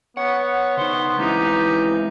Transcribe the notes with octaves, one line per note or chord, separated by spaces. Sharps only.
B3 C#5 F#5
C#3 D#4 C5
E3 G#3 C4 C#4 D#4 G4